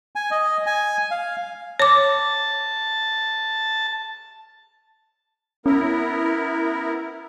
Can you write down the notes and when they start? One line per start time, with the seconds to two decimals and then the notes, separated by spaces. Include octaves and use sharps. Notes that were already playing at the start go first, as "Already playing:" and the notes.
0.16 G#5
0.31 D#5
0.66 G#5
1.11 F5
1.80 C#5 A5 D6
5.66 B3 C#4 E4 A#4